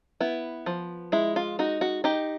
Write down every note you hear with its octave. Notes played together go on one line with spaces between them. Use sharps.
B3 E4
F3
G#3 E4
F4
D#4 F#4
F#4
D#4 G4